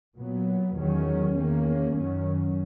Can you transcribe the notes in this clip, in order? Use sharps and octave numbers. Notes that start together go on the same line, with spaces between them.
A#2 F#3 B3
E2 D#3 F#3 C#4
E2 D#3 A#3 C#4
F#2 D#3 F#3 C#4